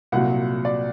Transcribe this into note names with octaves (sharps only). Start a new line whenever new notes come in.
C2 A#2 F#3 F#5
D5